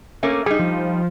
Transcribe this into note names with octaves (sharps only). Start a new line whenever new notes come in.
A3 A#3 C#4
G3 D#4 G#4
F3